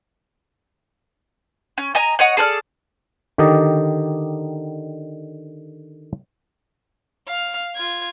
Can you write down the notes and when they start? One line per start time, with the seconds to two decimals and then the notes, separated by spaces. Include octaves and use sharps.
1.78 C#4
1.95 D#5 G#5 A#5
2.19 C#5 D#5 F#5
2.37 G#4 A4 D5 F6
3.38 D3 D#3 G4 D5 D#5 G5
7.27 F5 F6
7.75 F4 G#6